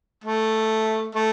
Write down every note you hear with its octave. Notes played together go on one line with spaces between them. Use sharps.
A3
A3